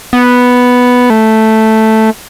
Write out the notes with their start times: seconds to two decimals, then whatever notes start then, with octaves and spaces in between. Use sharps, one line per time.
0.13 B3
1.10 A3